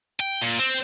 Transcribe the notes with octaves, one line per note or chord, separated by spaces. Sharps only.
G5
A#2
C4